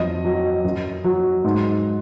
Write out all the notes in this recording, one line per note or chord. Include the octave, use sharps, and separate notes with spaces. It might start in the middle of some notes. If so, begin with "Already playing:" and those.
Already playing: F2 F#3 D#5
F#3
F#2
F#3
G#2